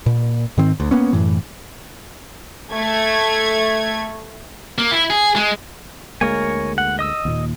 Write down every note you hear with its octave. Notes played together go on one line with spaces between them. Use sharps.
A#2
G#2 D#3 C4
D2
A#3 B3 C#4
F#2 A2 E3
A3 G#6
A#3
E4
G#4
G#3
D2 G#3 A#3 A#4 C#5 G#5
F#5
D#5 D#6 E6
D#2 A#2